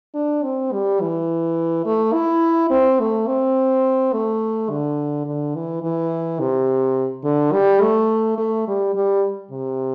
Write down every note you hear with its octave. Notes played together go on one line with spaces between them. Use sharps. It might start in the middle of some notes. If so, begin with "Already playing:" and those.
D4
C4
G3
E3
A3
E4
C4
A3
C4
A3
D3
D3
E3
E3
C3
D3
G3
A3
A3
G3
G3
C3